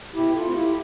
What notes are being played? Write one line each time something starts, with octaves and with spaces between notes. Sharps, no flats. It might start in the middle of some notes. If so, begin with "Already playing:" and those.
B2 E4 G4
F4 A4
A3 C4
E4 G4